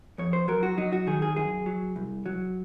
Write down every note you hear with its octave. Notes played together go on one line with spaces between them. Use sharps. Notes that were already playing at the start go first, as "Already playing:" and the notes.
F2 C#5
C5
F#3 A#4
F#4
F#3 D#4
F#4
D#3 G#4
G#4
F#2 G#4
F#3
C2
F#3